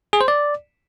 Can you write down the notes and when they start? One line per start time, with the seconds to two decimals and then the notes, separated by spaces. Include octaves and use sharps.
0.13 G#4
0.21 C5
0.28 D5